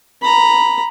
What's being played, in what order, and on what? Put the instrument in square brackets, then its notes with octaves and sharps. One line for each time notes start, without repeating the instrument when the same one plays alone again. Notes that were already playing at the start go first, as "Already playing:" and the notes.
[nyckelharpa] A#5 B5